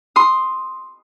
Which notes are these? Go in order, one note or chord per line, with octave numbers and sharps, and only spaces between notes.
C6 D#6